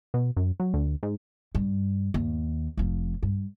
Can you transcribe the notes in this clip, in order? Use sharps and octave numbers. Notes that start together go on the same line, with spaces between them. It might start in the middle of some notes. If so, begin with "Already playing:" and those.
B2
F#2
F#3
D2
G#2
G2
D#2
F1 F3
G2